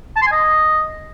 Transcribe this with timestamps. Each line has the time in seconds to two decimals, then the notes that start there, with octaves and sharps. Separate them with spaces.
0.16 A5
0.21 C6
0.27 G#5
0.32 D#5